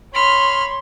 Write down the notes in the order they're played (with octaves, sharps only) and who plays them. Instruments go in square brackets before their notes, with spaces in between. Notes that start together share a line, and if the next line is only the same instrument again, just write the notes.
[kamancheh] C#5 C6 [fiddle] B5 F6